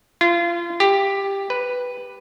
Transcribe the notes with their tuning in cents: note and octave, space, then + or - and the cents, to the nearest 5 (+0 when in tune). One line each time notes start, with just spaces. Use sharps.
F4 -30
G4 +10
B4 +0